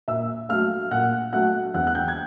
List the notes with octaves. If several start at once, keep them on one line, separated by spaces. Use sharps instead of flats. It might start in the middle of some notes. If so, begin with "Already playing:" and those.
A#2 E5 E6
F#3 A3 F5 F6
A#2 F#5 F#6
F#3 A3 F#5 F#6
E2 F#5 F#6
F#6
G5 G6
G#6